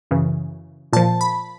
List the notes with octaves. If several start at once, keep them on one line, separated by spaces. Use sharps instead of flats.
F#2 C#3 E3
A#2 F3 A5
B5